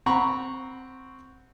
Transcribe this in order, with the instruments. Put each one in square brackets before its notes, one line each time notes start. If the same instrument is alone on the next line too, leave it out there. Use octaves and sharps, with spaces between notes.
[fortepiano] C4 F#5 A#5 B5 C#6